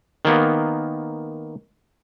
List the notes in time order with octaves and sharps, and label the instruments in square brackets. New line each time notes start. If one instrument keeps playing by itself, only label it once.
[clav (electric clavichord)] D#3 A#3 B3